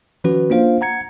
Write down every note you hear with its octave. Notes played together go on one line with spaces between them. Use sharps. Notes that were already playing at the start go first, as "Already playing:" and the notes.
D#3 F3 C#4 F#4 B4
A#3 D4 F4 C5 F5
F#5 A#5 G#6 C#7